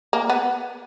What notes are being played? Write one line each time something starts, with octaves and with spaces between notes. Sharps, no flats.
A#3
B3